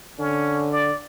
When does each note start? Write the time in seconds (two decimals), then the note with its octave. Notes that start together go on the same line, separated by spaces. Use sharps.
0.19 D3 C#4
0.72 D5